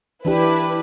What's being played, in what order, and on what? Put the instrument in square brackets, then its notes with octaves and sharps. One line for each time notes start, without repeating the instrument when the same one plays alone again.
[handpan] E3 D4 G4 [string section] E4 B4